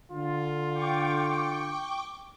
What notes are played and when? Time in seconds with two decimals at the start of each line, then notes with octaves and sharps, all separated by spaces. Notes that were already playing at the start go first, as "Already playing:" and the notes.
0.12 D3 F4
0.74 G5 C#6 D6